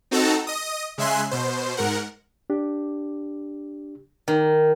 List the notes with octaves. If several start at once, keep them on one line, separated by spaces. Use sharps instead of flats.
C4 D#4 F#4 A4 A5 A#5
D#5 D#6
C#3 G#3 E5 G#5 C6 F#6
B2 C5
G#2 A#4 F#5
D4 G4
D#3